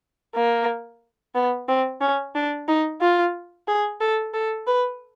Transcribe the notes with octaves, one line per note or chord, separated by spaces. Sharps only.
A#3
B3
C4
C#4
D4
D#4
F4
G#4
A4
A4
B4